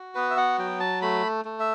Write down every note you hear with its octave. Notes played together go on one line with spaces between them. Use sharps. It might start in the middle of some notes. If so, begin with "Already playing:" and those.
Already playing: F#4
B3 B4
E5
F#5
F#3 G5
A5
A3 B5
A3
E5